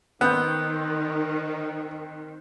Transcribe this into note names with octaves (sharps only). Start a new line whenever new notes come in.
D#3 B3 C4 G5 F#6